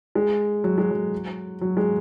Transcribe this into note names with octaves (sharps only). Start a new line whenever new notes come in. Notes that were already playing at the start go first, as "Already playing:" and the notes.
G#3
F#3
G#3
F#3
F#3
G#3